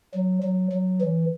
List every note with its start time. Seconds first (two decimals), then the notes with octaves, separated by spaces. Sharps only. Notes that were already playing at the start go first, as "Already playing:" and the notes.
0.14 F#3
0.43 F#3
0.72 F#3
1.01 E3